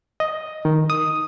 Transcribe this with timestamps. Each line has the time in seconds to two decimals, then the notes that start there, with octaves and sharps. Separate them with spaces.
0.20 D#5
0.65 D#3
0.90 D#6